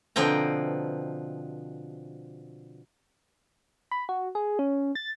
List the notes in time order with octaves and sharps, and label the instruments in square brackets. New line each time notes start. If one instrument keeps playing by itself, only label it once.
[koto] B2 D3 F3 C4 G5 A#5
[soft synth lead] B5
F#4
G#4
C#4
A6